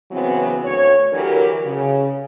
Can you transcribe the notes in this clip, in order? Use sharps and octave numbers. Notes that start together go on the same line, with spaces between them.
C#3 E3 F#3 B3 C4
D2 C#5
D3 E3 F#3 G4 A#4
C#3